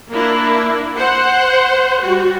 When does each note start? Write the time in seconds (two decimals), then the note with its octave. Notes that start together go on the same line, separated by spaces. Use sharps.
0.12 A#3 D4 E4
0.97 C5 F#5
2.02 G3 F#4